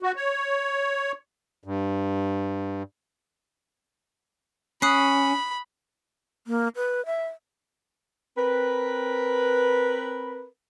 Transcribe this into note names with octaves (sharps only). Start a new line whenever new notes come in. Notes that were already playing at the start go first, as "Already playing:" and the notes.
F#4
C#5
G2
C#4 B5 D#6 F#6 C7
A#3
B4
E5
C4 A#4 B4